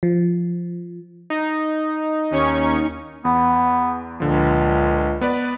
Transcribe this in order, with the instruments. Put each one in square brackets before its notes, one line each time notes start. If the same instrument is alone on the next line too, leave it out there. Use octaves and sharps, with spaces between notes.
[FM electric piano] F3
[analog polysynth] D#4
[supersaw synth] D#2 C#4 C#6
[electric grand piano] E2 [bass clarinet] B3
[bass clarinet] C#2 [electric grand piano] A#2 D3 F3
[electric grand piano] B3 B4 D5